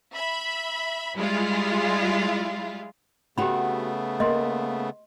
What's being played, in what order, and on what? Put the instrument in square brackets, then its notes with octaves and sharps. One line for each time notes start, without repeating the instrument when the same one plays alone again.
[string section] E5 B5
G3 G#3 E4 F4
[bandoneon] C#3 A3 B3 [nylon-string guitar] C4 F#4 [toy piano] G4 B5
[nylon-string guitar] A#3 [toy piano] D#5 C6